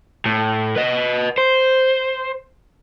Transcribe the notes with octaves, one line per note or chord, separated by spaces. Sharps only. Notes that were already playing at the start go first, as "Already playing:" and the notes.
A2
B4 D#5
C5